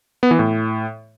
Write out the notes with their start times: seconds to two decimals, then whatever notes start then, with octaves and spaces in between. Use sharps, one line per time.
0.23 B3
0.31 E3
0.39 A2